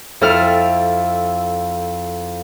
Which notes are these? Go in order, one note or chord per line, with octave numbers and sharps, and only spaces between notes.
F2 E4 A4 F6